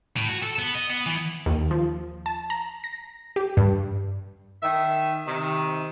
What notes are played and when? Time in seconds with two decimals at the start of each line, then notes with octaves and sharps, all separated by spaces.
0.17 A2
0.29 F#4
0.43 A4
0.59 B3
0.75 D#5
0.90 B3
1.06 E3
1.46 D#2
1.71 F3
2.26 A5
2.50 A#5
2.84 A#6
3.36 G4
3.57 G2
4.63 D#3 E5
5.27 C3 D#3